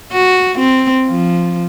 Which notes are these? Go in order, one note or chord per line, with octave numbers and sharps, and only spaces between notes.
F#4
C4
F3